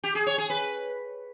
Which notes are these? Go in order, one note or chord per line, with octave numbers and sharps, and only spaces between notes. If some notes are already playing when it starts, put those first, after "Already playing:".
G4
G#4
C#5
G#4
B4